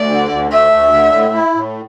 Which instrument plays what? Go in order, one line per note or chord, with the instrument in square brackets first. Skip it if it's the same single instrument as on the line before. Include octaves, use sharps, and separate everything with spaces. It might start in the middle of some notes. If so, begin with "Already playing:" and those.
Already playing: [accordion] D2 [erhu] D5
[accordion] D3
D2
[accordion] A3 [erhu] E5
[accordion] D2
D3
A2
E4
A2